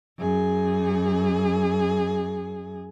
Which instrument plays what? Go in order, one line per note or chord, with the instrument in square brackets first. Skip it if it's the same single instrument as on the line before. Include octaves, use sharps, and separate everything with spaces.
[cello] F#2 G#4